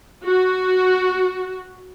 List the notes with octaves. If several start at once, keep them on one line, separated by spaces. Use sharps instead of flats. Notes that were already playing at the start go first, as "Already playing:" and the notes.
F#4